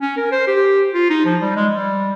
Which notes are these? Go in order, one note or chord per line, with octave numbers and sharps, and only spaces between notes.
C#4
A#4
C5
G4
F4
D#4
F3
G3
G#3
G3